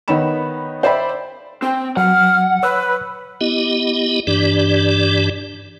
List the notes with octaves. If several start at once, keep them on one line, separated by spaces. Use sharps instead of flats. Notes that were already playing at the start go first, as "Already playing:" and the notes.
D#3 B3 D#4 C#5 B5 E7
C5 D5 E5 G5 B5
C4 G5
F#3 F#5 F6
B4 C#5 E6 F#6
B3 E4 G4 D#5
G2 E3 D4 G4 D5